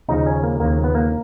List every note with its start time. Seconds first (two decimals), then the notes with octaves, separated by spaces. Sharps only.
0.08 D#2 C#3 F3 D#4
0.26 C#4
0.43 A#3
0.60 D#2 C#3 F3 A#3
0.84 B3
0.95 A#3